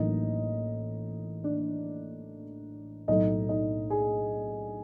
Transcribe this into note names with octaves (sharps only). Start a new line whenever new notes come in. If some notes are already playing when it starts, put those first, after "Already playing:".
Already playing: A1 A2 F#3 A#3 D4 D#4 D#5
D4 D5
B1 A2 F#3 A3 D#4 D#5
D#4 D#5
G#4 G#5